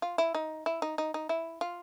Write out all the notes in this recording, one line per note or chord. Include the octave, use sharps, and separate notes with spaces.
F4
E4
D#4
E4
D#4
D#4
D#4
E4
F4